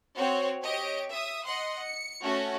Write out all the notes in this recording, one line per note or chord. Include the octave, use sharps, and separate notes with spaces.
C4 F#4 C#5
G4 C#5 D#5 D7
E5 D#6
D#5 F#5 C6
C#7
A3 C#4 F#4